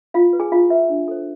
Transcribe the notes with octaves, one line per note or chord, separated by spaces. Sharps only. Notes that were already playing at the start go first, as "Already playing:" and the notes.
E4 F4 F5
B4
G#4 G#5
E4 F4 F5
G#4 B4 E5
D4
A4 C5